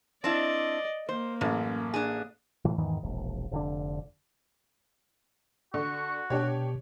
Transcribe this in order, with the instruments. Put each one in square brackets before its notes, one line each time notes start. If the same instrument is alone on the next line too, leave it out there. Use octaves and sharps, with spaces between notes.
[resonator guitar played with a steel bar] C4 D4 E4 [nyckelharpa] D5 D#5
[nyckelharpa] A#3 [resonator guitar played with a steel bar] C5
[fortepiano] A1 [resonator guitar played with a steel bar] F#2
[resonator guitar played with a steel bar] D4 G#4
[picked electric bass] A2 E3
E2 G#2 D#3 E3
E1 A#1
F1 D3 D4
[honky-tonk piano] D3 [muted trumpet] F#4 [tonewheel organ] C#6
[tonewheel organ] B2 [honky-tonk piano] D4 G4 C#5